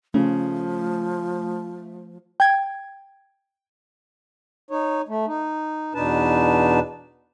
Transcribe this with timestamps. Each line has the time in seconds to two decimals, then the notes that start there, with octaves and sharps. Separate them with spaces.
0.14 C#3 F3 A3
2.40 G5 G#6
4.71 D#4 C#5
5.08 A3
5.27 D#4
5.95 E2 B2 D4 D#4 B4 A5